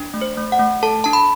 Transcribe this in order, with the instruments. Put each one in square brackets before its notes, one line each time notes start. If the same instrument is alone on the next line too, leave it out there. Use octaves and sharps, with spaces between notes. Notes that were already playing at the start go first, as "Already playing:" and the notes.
Already playing: [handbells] D4
A3
C5
A3
F#5
A3
A4 A5
D4 A5
B5